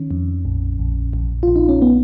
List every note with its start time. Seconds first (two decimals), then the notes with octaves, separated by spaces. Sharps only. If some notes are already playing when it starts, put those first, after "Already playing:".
Already playing: D#3 C#4
0.11 F2
0.45 A#1
0.79 A#1
1.13 A#1
1.43 A#1 F4
1.56 D#4
1.69 C#4
1.82 B3